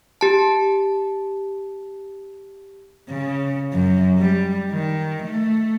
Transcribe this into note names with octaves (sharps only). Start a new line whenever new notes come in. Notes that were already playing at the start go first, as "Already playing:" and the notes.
G4 A5
C#3
F#2
G3
D#3
A3